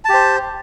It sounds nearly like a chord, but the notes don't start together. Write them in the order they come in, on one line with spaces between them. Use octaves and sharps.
A5 G4 C5